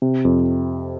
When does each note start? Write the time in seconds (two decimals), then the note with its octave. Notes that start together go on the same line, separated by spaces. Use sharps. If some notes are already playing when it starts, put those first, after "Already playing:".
0.02 C3
0.25 F2